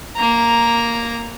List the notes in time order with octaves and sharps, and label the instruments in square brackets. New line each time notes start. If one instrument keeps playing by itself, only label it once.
[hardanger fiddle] A#3 A#5